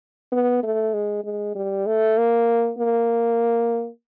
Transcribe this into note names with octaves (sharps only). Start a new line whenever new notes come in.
B3
A3
G#3
G#3
G3
A3
A#3
A#3